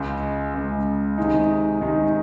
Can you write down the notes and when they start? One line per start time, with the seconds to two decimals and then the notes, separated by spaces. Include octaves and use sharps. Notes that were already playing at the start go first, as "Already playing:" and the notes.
Already playing: C#2 C#3 G#3
0.54 C#2 C#3 G#3
1.18 C3 D#3 G#3 D#4
1.81 C3 D#3 G#3 D#4